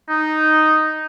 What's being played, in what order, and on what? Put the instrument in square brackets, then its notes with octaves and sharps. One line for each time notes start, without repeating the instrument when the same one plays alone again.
[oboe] D#4